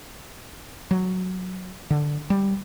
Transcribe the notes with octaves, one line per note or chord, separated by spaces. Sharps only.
F#3
D3
G3